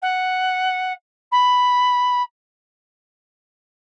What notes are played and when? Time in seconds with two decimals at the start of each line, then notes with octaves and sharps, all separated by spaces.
0.02 F#5
1.31 B5